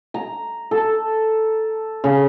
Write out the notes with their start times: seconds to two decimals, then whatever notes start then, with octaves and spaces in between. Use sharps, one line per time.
0.14 A#5
0.71 A4
2.04 C#3